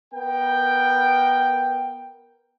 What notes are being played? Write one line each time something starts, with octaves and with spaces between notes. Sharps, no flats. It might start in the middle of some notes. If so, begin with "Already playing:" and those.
B3 A#4 G5